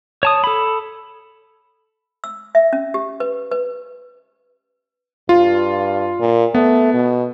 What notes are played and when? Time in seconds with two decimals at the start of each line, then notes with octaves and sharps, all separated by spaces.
0.23 C#5 A5 D#6
0.44 A4 B5
2.24 E6
2.55 E5
2.73 C#4
2.94 G4
3.20 B4
3.51 B4
5.29 G2 F4
6.20 A#2
6.55 A3 B3
6.94 B2